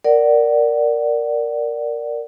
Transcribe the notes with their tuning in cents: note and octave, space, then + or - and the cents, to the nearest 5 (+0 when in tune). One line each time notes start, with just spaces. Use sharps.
A#4 +0 D5 +0 F#5 +20